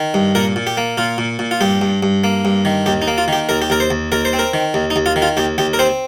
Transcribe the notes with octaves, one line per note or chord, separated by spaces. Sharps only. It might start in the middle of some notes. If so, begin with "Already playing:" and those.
Already playing: D#3
G2
A#2 A#4
A#2
G4
A#3
A#2 F4
A#2
A#2
F4
G2 G4
G2
G2
A#3
G2
D#3
D#2 G4
D#4
A#3
F4
D#3 G4
D#2 A#4
G4
D#2 A#4
C5
D#2
D#2 A#4
C5
C4
A#4
D#3
D#2
D#4
D#2
F4
D#3
F4
D#2 G4
D#2 G4
A#4
C4 C5